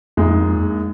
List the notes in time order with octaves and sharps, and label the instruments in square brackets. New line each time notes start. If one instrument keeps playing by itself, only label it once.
[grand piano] A#1 A#2 G#3 D#4 [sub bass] F2